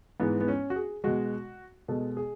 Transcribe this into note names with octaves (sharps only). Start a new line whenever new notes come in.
G#2 E3 G#3 B3
B3
C#4
F#4
G#4
B2 G#3 F#4
B2 G#3 A4
G#4